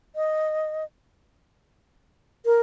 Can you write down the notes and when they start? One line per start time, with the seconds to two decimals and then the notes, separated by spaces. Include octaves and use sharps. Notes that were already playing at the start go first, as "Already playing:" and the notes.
0.16 D#5
2.45 A#4